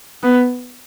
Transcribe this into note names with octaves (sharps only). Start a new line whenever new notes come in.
B3